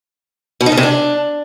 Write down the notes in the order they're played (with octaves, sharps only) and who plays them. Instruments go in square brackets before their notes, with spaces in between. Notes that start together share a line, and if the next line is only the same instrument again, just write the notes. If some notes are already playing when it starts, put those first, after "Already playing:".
[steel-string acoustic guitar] B2
D#4
C#3
C3
D4